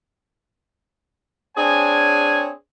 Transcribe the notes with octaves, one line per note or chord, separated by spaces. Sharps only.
C4 D4 G#4 C#5 G#5